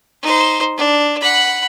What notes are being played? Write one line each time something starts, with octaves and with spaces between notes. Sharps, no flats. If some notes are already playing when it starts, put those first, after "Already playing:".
D#4 C5
D4
F#5 B5